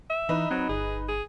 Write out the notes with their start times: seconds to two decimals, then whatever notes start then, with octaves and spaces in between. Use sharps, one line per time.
0.10 E5
0.29 E3 D#4 B4
0.51 F#3 C4
0.69 G1 G#4
1.08 G#4